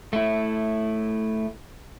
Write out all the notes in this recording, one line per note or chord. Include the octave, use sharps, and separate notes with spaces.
A3 E4